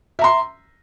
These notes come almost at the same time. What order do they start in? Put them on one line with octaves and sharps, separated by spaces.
E5 A#5 C6